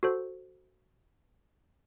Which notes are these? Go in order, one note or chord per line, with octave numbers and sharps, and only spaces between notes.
F#4 A4 C5